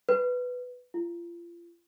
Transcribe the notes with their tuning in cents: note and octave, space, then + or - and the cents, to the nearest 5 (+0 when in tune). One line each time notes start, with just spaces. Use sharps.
B4 +5
F4 -30